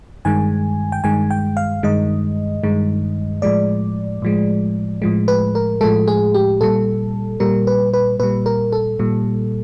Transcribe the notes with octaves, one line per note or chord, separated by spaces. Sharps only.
G2 D#3 G#3 G#5
G5
G2 D#3 G#3 G#5
G5
F5
G2 D#3 G#3 D#5
G2 D#3 G#3
A2 F3 G#3 D5
A2 F3 G#3
A2 F3 G#3
B4
A#4
A2 F3 G#3 A4
G#4
G4
A#2 G3 A4
A#2 G3 A#4
B4
B4
A#2 G3 B4
A#4
A4
A#2 G3